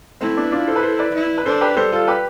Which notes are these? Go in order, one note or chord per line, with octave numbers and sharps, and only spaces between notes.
A3 C4 E4
B3 D4
D4 F4
A4 C5
B4
A4 C5
B4 D5
E4
B4
D4 A4 C5
G4 B4
G3 A4 C5
F4 A4
G4 B4